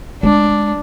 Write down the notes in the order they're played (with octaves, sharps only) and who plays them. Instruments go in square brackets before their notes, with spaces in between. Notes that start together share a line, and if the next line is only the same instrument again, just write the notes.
[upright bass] G#3 [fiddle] D4